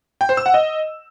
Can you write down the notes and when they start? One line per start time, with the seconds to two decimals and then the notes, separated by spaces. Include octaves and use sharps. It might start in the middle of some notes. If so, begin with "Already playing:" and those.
0.21 G5
0.29 C5
0.37 E6
0.46 F#5
0.54 D#5